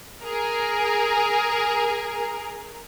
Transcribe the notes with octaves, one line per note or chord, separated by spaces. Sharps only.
G#4 A#4